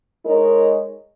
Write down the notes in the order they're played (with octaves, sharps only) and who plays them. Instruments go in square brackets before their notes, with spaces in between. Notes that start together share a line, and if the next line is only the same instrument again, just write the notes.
[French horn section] G#3 D#4 A#4 C#5